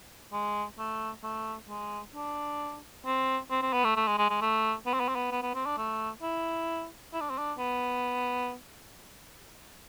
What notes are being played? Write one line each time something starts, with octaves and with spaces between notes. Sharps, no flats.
G#3
A3
A3
G#3
D4
C4
C4
C4
B3
A3
A3
G#3
G#3
G#3
A3
B3
C4
B3
C4
B3
B3
B3
C4
D4
A3
E4
E4
D4
C4
D4
B3